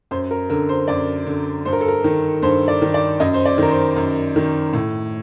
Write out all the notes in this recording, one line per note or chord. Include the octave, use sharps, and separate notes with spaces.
F#2 C5
A#4
D3 A#4
C5
F#2 D5
D3
G2 C5
A#4
A4
A#4
D#3
G2 C5
D5
D#3
D5
F#2 D#5
C5
D5
D#3 A#4
C5
F#2
D#3
A2